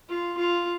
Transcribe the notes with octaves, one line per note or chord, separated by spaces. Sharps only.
F4
F4